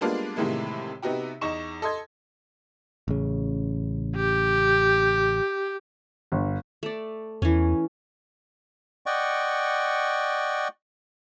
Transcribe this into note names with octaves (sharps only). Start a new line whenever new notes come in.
G3 G#3 A#3 B3 D4 F4
A2 C3 D#3 E3 G#3 A#3
C3 B3 D#4 F#4 G4
E2 D#4 C#6 E7
A4 D#5 C6 G#6
A1 C#3
G4
G1
A3 D5
E2 E3 C#4
D5 D#5 F#5 G5 C#6